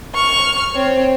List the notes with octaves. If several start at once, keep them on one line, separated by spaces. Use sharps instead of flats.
C#6 F6
C4 C#5